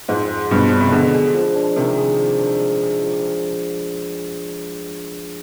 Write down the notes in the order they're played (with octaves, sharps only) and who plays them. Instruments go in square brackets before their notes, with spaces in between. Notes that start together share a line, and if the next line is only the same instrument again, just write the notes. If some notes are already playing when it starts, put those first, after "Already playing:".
[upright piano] F2 G#2 [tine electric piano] G#3
[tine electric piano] G#4
[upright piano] G2 B2 [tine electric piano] F3
[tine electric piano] D4
[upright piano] C3
[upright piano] B2 D3 [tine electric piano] G#3
[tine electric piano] G#4
F3
D4
[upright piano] C3 D#3 [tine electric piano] G#3
[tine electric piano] G#4
F3
D4
G#3
G#4
F3